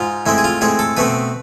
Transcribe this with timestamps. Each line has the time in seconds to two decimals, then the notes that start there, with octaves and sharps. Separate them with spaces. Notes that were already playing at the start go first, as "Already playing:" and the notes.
Already playing: G#2 F4
0.26 A2 G#3 C4 E4
0.38 G#4
0.44 F4
0.61 A2 G#3 C4 G#4
0.79 A4
0.97 B2 A3 C4 B4